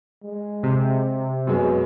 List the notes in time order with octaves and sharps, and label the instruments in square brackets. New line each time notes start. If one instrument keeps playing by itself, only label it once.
[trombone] G#3
[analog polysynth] C3
[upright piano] F#2 G#3 [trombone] B2